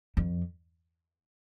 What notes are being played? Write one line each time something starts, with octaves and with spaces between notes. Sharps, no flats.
F2